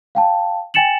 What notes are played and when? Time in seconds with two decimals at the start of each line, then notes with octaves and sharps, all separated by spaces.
0.15 F5 G5 A5
0.74 G5 G#5 A6 C#7 E7 F#7